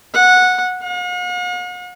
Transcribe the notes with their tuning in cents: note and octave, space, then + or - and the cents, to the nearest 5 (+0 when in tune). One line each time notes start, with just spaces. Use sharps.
F#5 -15
F#5 -45